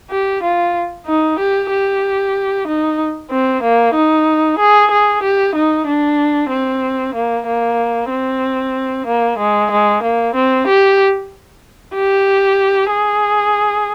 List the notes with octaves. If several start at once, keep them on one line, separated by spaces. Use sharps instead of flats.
G4
F4
D#4
G4
G4
D#4
C4
A#3
D#4
G#4
G#4
G4
D#4
D4
C4
A#3
A#3
C4
A#3
G#3
G#3
A#3
C4
G4
G4
G#4